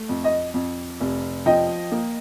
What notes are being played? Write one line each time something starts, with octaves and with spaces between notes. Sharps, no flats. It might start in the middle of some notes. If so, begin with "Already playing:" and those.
Already playing: A3
F2
D#5
F2
F1
F3 D#5 G5
A#3